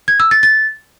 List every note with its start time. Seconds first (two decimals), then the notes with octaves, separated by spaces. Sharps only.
0.08 G#6
0.20 E6
0.31 A6
0.43 A6